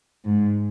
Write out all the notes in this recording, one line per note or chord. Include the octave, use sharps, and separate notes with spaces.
G#2